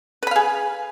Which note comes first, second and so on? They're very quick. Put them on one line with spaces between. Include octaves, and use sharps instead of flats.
B4 B5 F5 G#4